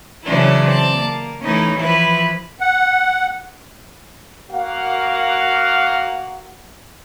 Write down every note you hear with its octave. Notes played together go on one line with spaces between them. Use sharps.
C#3 E3 F#3 C#4 D4 E4
C4 D5 A5
A#3
E3 A3 C#4 D#4 E4
E3 F3 E4 B4
F#5
A#3 F#4 F5 F#5